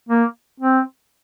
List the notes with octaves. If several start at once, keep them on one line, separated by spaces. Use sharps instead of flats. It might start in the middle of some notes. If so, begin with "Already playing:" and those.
A#3
C4